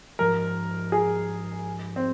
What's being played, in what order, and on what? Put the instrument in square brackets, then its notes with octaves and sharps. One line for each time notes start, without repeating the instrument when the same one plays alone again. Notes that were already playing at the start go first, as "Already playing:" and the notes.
[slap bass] G#2 F3 G#3 [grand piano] A#4
[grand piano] G#4
C4